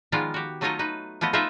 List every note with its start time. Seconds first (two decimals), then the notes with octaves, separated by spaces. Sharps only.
0.12 D#3 F3 G#3 B3 F4 D5
0.34 F#4 G4
0.61 F#3 A3 D#4 F4 C#5 D#5
0.79 D#4 B4
1.21 F3 A3 B3 D#5
1.33 D#4 F4 B4 C5 D#5 E5